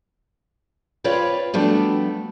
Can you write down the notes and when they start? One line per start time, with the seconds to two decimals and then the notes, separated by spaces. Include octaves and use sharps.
1.04 C4 F4 B4 C#5 D5
1.54 F3 G3 A3 B3 D4 F#4